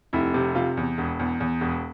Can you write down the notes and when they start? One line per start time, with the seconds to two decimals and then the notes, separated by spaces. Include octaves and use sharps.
0.13 F1 E4
0.34 C3
0.55 C3 F4
0.77 E2
0.98 E1
1.19 E2
1.40 E2
1.61 E1